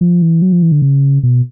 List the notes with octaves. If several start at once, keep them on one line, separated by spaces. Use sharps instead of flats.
F3
E3
F#3
F3
E3
D3
C#3
B2